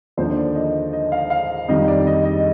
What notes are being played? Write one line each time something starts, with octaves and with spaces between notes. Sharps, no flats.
D#2 D3 F3 C5
D5
D#5
D#5
F5
F5
F2 D#3 G3 D#5
D5
D#5
D#5